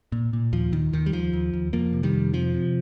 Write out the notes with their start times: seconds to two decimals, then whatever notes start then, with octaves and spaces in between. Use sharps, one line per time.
0.12 A#2
0.33 A#2
0.53 D#2 F3
0.72 D#2 D#3
0.93 D#2 D#3
1.06 G3
1.12 D#2 F3
1.33 D#2
1.53 D#2
1.73 F2 F3 A#3
1.93 C3
2.03 D#3 G3
2.13 F2
2.33 C3 F3
2.54 C3